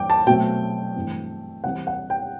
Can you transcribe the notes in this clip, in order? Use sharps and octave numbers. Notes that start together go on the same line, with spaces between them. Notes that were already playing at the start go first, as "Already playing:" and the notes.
Already playing: G2 E3 G5 D6
A5
B2 F#3 A3 C4 G5
G2 E3 A3 C4
C3 E3 G3 C4 F#5
F#5
G5